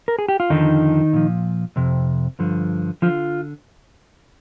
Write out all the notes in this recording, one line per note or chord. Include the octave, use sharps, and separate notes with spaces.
A#4
G#4
G4
F4
F2 D3 D#3 F3 D#4
A#2 F3
F2 C3
G2 D3 F3
D3 F3 F4